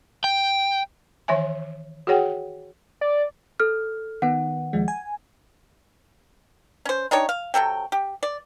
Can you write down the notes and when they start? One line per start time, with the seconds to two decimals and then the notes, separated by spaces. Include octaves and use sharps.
0.24 G5
1.28 D#3 E3 C#5 E5 G#5
2.07 F#4 G#4 C#5 F#5 G5
3.01 D5
3.60 A4 F6
4.22 D#3 B3 F#5
4.73 D#2 F3 G#3
4.88 G#5
6.85 C#4 C5
7.11 D4 D#4 G4 C#5
7.29 F5
7.54 C3 F#3 A4 G5
7.92 G4
8.23 D5